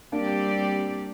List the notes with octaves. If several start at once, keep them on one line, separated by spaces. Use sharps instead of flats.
G3 A#3 C4 D4 G4 D5